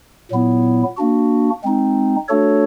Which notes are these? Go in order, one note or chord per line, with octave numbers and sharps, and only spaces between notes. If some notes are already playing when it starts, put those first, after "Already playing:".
A#2 F#3 B3 E4
A#3 D4 F#4
G#3 C4 D#4
A3 D4 F#4 A4 C#5